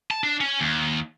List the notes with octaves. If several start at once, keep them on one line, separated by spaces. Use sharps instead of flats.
A5
D4
C#4
D#2